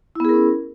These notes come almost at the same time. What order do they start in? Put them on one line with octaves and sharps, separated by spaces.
E4 B3 G#4 A#4 C#4